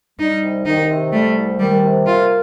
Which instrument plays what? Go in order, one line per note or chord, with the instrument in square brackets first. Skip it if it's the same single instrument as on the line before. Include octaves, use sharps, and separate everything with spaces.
[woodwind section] G3 [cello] D#4
[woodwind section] C2
[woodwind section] D#3 [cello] D#4
[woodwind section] C3
[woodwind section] G3 [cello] A3
[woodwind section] C2
[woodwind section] D#3 [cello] G3
[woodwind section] C3
[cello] F4 [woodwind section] A#4